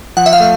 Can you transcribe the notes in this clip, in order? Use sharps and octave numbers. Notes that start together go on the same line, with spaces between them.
F3 F#5
E5
F5
A3